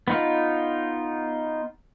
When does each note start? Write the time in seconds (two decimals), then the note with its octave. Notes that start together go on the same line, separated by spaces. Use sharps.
0.08 B3 D#4 F4